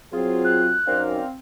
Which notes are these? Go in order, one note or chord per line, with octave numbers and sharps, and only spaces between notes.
F#3 C4 F4 G#4
F#6
F#2 C4 D#4 A#4 D5 F5